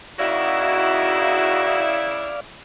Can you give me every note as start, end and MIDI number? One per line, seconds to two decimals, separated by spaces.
0.19 2.44 49
0.19 1.86 58
0.19 1.86 63
0.19 2.44 64
0.19 1.86 66
0.19 2.40 74
0.19 2.40 77